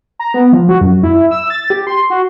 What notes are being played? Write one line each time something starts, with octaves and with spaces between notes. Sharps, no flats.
A#5
B3
F3
F#4
F#2
E4
E6
A6
G4
C6
F#4